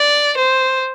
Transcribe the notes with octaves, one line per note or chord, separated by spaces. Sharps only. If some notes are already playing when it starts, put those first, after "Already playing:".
Already playing: D5
C5